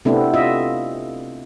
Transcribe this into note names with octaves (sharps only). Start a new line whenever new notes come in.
C3 A3 B3 C4 D4 E4
F4 D#5 E5